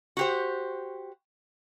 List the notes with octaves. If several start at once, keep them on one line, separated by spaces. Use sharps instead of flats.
F#4 G4 C5